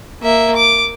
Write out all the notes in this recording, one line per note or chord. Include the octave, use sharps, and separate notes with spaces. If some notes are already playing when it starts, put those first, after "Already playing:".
A#3 E5
D6